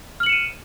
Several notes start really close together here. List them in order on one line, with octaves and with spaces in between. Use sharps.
F6 F#7 C#7 E7 D#7